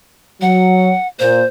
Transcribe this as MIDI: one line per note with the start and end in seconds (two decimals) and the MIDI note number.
0.42 0.91 54
0.42 1.07 78
1.19 1.41 46
1.19 1.46 72